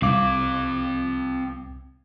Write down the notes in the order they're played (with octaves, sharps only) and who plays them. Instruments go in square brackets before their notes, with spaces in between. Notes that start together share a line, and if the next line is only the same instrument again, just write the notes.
[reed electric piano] C2 D6 [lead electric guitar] C4 F5